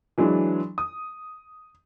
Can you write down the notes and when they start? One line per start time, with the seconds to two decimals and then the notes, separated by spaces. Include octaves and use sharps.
0.18 E3 F#3 G#3 D4
0.78 D#6